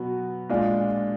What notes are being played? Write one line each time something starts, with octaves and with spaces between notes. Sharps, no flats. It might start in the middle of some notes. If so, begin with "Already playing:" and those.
Already playing: B2 F#3 B3 F#4
A#2 G#3 D4 F4